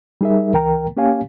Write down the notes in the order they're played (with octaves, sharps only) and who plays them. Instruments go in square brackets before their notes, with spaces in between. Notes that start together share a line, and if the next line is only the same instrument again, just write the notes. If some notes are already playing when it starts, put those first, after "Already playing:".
[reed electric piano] G3 D#4 G#4 A#4 E5
C#2 E3 A#4 G5 A#5
A#3 C#4 G4 C#5 F5 G#5